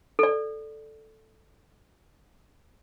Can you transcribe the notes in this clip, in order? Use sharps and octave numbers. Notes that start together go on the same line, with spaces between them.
A4 D5